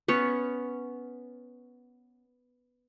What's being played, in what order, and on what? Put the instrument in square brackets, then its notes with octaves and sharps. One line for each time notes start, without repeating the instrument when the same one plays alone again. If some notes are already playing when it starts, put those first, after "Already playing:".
[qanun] B3 C#4 C#5